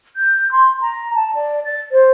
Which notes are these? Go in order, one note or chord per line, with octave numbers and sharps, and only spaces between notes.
G6
C6
A#5
A5
D5
A6
C5